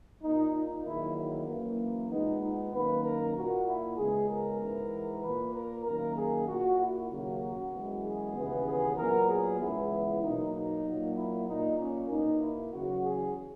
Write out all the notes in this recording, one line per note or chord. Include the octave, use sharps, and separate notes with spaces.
A#2 A#3 D#4
D#4
E2 D#3 F#3 A#3 E4
E4
F#2 E3 A#3
A#2 G#3 B3 D#4
D#4
F#2 D#3 A#3 B4
A#4
A#2 A#3 F#4
E4
C#2 C#3 G#3 B3 G#4
A#4
G#2 E3 B3
A#2 A#3 B4
A#4
F#2 D#3 A#3 A#4
G#4
A#2 A#3 F#4
E4
D#2 C#3 F#3 A#3 F#4
F#2 E3 G#3 B3
G#4
D#2 C#3 E3 B3
G#4
A#2 F#3 B3 A#4
G#4
C#2 C#3 E3 B3 E4
B2 F#3 A#3 D#4
D#4
A#2 F#3 A#3
E4
A#2 A#3 D#4
C#4
B2 A#3 D#4
E4
E2 C#3 F#3 F#4
G#4